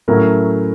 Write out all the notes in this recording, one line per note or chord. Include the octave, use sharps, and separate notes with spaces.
A2 F#3 A3 C#4 E4 A#4